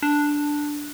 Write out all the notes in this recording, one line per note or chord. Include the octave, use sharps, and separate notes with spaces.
D4